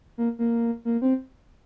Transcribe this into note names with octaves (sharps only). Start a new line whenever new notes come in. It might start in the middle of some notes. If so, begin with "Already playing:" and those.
A#3
A#3
A#3
C4